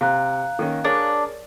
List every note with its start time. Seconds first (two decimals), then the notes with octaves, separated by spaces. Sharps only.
0.01 C3 F5 A#5 F#6
0.59 D#3 A#3 C#4
0.84 D4 G#4 A#4 C#5